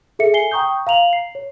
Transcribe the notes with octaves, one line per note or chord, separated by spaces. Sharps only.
G#4 A4 E5 C#7
G#5 C7 G7
G5 A#5 C#6 D#6 G6
F5 A#5 F7 F#7
C7
C#5